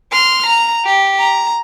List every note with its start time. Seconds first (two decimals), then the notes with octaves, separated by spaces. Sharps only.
0.12 C6 F6
0.47 A#5
0.86 G4
1.19 A#5